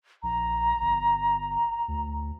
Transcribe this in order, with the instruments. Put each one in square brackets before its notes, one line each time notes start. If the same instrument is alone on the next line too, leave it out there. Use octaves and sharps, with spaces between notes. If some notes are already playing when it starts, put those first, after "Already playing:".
[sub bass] A#1 [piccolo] A#5
[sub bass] G1
D2